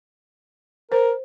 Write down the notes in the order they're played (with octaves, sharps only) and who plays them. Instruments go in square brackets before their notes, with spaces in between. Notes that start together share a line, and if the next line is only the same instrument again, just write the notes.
[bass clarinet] A#4 [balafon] C5